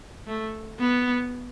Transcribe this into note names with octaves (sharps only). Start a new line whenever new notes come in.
A3
B3